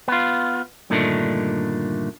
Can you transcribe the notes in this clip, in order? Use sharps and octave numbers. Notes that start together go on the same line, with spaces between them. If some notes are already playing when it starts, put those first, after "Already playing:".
B3 F4
G2 A#2 D3 D#3 A3 D4